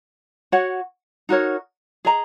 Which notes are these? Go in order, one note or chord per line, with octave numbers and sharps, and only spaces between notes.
F#4 C#5 F#5
D#4 F#4 A#4 C#5
G#4 D#5 A#5